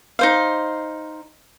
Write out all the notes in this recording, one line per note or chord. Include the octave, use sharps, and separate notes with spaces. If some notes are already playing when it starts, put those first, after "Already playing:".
D#4 C5 F5